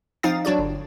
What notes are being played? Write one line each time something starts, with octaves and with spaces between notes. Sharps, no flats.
F3 C4 D#4 F5 D#6 A6
F#3 D4 F#4 D5
G1